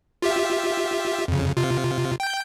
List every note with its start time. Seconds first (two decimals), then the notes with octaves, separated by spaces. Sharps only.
0.22 F4 G4 E5
1.28 F2 C#3
1.57 C3 F4
2.20 G5 G6